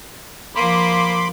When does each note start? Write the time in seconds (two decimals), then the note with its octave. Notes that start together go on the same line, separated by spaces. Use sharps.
0.55 F3 A#3 B5 C6 D6